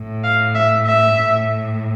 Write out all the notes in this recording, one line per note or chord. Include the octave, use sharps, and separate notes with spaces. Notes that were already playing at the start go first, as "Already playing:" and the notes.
Already playing: A2
F5
E5
E5
A2